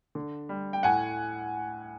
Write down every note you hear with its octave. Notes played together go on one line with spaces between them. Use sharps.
D3
G3
G5
A2 F#5 G#5